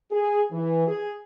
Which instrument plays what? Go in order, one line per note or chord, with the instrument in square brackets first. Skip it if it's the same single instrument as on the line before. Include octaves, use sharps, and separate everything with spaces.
[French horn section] G#4
E3
G#4